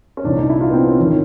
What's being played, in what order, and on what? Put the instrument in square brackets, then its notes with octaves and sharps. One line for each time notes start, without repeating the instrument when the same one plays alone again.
[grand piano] C#4
C2 A#2 D4
D#4
E4
F4
B3
C4
C#4
G#1 D#3 C#4